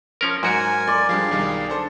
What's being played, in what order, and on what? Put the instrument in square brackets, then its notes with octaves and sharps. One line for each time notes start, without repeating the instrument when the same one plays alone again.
[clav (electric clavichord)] F3 C#4 A#4
[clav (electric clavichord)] G#2 F#4 [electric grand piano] F#3 [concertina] A#4 G#5
[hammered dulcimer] D5 [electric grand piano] C6
[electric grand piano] F3 G3 D4 [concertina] G#4 F5
[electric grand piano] B1 D#3 G3
[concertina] D4 [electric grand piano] A4 C5